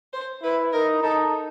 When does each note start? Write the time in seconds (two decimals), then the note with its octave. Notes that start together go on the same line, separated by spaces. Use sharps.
0.13 C5
0.43 E4 B4
0.73 D#4 A#4
1.03 D#4 A4